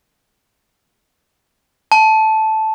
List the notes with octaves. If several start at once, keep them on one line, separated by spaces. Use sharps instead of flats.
A5